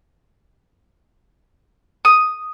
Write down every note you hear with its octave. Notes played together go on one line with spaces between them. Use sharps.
D#6